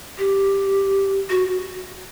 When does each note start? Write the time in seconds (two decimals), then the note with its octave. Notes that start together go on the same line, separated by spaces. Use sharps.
0.18 G4
1.30 F#4